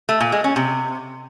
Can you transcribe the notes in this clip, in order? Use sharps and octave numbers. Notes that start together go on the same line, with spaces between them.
A3
A#2
G#3
C#4
C3